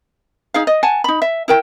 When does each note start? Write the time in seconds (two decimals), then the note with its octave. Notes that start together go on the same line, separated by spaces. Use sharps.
0.54 D#4 G#4 F5
0.67 D#5
0.83 F#5 G#5 A5
1.04 D#4 B5
1.22 E5
1.48 E4 A#4 G5